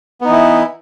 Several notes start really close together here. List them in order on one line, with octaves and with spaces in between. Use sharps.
B3 D#4 E3 E4